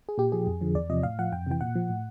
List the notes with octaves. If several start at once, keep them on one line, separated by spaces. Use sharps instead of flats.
G#4
A#2 G4
F3 G#4
F2
D3 F3
E2 D5
C3 F3 D#5
A2 F5
F3 F#5
F2 G5
C3 E3 G5
A#2 F#5
F3
A2